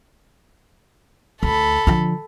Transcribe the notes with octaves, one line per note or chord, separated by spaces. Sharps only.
D2 A4 B5
D3 F3